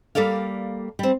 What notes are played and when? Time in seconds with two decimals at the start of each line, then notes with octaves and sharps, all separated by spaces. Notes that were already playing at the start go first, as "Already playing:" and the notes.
0.15 G3 A#3 A4 D5 F5
0.99 G3 C4